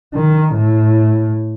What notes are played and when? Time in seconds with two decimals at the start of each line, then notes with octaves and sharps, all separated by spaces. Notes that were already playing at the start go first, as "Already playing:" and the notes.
0.14 D#3
0.54 A2